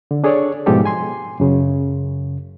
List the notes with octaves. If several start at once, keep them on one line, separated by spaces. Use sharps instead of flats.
D3
D4 G#4 A4 C#5 D5
G#2 B2 F3 G#3 G4 A4
G#5 C6
F#2 C#3